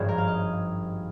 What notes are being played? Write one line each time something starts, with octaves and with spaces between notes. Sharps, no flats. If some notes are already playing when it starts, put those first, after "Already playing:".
Already playing: G#1 G2 F3 G#4 C#5
A#4
F5
D#5